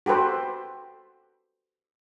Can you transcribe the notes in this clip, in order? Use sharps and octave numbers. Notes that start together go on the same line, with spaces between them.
F#4 G4 A4 B4 C5